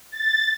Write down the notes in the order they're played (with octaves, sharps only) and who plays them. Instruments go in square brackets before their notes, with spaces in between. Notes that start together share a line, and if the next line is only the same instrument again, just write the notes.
[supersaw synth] A6